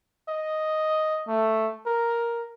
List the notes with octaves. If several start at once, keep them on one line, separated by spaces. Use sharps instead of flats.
D#5
A3
A#4